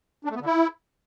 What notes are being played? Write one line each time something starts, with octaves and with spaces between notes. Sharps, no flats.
D4
A3
B3
D3
E4